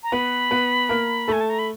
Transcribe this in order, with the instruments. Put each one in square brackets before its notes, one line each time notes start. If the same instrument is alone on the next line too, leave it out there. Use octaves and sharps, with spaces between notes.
[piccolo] A#5
[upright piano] B3 B4 [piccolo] B5
[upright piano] B3 B4
A#3 A#4
[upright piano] A3 A4 [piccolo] G#5
[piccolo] A5
A#5
B5